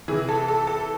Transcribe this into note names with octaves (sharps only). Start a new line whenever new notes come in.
C3 E3 G#4
A4
A4
A4